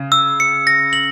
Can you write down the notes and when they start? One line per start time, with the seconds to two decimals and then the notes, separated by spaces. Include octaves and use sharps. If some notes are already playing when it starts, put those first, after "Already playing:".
Already playing: C#3
0.12 E6
0.40 C#7
0.67 A#6
0.93 F#7